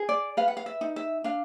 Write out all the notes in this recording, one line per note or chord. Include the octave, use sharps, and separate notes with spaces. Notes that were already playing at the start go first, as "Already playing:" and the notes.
Already playing: G#4
D5
B4 F5
F#5
F5
E5
D#4
E5
D4 F5